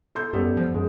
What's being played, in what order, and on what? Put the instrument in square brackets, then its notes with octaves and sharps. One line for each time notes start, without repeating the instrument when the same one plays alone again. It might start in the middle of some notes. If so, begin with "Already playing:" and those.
[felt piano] A4 C6 G6
[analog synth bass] F#2 [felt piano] G3 B3 A4
[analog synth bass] F3
[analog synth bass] F#2 [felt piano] G#3